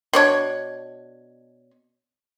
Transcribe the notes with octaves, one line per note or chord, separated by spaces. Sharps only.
B2 D4 C#5